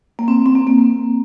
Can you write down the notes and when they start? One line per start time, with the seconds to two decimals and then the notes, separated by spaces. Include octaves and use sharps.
0.19 A#3
0.28 C4
0.46 C4
0.55 A#3
0.67 A#3
0.79 A#3